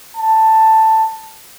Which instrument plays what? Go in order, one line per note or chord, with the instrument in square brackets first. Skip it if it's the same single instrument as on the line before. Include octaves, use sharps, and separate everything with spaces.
[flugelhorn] A5